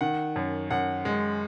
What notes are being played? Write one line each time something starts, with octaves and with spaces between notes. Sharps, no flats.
D#3 F#5
F#2
F#2 F#5
G#3